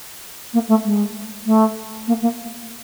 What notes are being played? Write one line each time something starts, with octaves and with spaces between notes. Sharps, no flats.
A#3
A3
G#3
A3
A#3
A#3